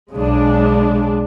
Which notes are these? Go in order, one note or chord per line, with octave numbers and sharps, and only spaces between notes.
B1 C#3 G#3 D4